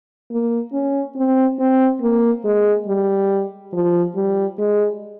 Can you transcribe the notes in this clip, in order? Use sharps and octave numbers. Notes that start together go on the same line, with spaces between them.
A#3
C#4
C4
C4
A#3
G#3
G3
F3
G3
G#3